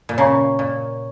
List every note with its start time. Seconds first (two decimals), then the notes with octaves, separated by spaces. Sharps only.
0.09 A#2
0.17 C#3 C#5 A#5 C#6
0.59 A#2